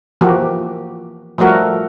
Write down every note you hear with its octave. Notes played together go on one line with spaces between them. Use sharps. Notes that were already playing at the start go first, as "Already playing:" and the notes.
E3 F3 A#3 F#4 G4
F3 G3 A3 F#4 A#4